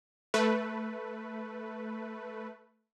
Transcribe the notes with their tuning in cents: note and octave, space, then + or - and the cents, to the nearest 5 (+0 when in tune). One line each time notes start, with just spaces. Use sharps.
A3 +0 B4 +0